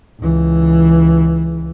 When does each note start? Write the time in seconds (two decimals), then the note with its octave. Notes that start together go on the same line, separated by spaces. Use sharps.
0.21 C#2 E3